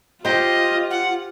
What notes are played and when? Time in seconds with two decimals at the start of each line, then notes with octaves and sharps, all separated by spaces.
0.25 F4 G4 C5 D#5
0.91 F#5